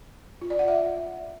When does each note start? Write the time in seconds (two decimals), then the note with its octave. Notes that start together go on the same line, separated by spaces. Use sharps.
0.41 F4
0.50 D5
0.59 F#5
0.68 E5